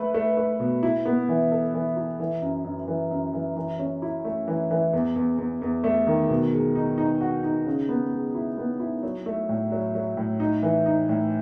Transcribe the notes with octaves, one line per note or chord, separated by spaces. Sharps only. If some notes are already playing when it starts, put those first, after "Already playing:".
Already playing: A3 B4
A3
A3
B2
E4
B3
E3
A4
E3
E4
E3
F#2
F#2
E3
F#2
E3
E3
C#4
E4
A3
E3
E3
E2
E2
E2
E2
A3
D#3
B2
G#3
D#4
D#4
F#4
D#4
C#3
B3
G#3
E4
B3
E4
F#3
A3
A2
F#3
F#3
A2
D#4
E3
D#4
A2